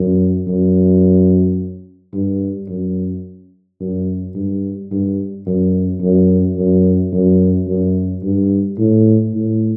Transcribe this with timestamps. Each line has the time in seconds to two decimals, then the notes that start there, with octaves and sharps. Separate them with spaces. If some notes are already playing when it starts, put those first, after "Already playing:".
Already playing: F#2
0.48 F#2
2.14 G2
2.69 F#2
3.80 F#2
4.35 G2
4.91 G2
5.47 F#2
6.02 F#2
6.57 F#2
7.12 F#2
7.68 F#2
8.23 G2
8.79 A2
9.34 A2